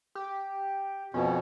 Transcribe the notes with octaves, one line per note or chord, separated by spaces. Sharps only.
G4
F2 B2 C#4